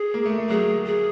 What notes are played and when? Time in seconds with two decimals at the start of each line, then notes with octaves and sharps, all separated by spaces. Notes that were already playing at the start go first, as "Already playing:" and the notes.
Already playing: G#4
0.14 A#3
0.26 A3
0.38 A3
0.49 F#3 G#4
0.86 G#4